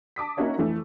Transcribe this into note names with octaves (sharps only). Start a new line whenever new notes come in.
A5 D6 D#6 B6
A#3 C#4 D#4 F#4 C#5 E5
F2 E3 A3